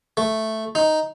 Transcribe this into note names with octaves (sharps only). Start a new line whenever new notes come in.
A3
D#4